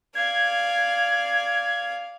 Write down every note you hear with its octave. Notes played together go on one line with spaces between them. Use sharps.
D5 F5 G#6